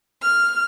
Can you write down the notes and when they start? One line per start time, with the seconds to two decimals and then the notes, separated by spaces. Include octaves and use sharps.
0.22 F6